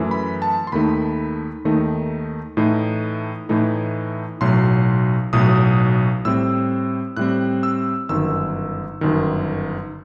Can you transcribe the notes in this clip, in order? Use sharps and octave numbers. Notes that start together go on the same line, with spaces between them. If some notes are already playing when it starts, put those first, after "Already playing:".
Already playing: F#2 E3 A3
B5
A5
C6
D#2 D#3 A3 D#4 B5
D#2 D#3 A3 D#4
A2 E3 A3 D#4
A2 E3 A3 D#4
B1 A2 F#3 C6
B1 A2 F#3 D#6
A2 G3 C4 E6
A2 G3 C4 F#6
E6
G1 F#2 D#3 E6
G1 F#2 D#3